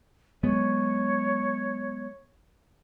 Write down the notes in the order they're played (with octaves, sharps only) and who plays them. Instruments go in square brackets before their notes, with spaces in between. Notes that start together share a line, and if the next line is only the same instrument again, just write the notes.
[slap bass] F#3 G#3 B3 [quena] C#5